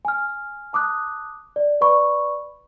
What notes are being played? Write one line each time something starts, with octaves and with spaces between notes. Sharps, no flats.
G#5 F6
A5 D6 D#6 F#6
D5
B4 D5 B5 C#6